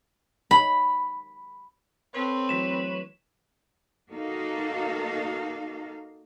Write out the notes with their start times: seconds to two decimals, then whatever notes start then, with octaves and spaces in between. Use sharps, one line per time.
0.51 B5
2.14 C4 A4 B4 C#5 C6
2.49 E3 F#3 A3 B6 E7
4.10 A#3 D#4 F#4 A4 F5